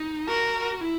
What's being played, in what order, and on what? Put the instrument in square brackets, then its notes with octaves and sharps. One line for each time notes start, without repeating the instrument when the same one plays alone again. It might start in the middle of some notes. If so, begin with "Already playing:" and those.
Already playing: [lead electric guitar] D#4
[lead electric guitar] F#4 [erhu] A#4
[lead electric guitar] E4